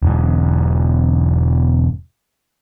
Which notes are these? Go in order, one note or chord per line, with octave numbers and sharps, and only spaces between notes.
E1 G#2